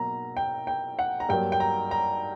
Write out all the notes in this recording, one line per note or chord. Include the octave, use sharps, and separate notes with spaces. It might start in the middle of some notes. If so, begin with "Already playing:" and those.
Already playing: B2 F#3 A#3 A#5
G5
G5
F#5
A#5
G2 F#3 A#3 G5
G5
A#5
A#5